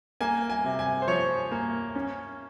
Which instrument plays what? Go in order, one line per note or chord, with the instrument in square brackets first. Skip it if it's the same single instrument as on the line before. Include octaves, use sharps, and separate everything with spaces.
[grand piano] A#3 G#5
G#5
C3
G#5
C5
F3 C#5
A#3 G#5
C#4